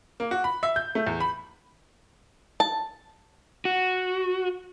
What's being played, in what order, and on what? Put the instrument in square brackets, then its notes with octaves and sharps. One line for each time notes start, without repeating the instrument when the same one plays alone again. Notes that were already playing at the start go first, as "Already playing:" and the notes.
[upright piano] A#3
F#4
B5
E5
G6
A3
E2
B5
[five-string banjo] A5
[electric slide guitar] F#4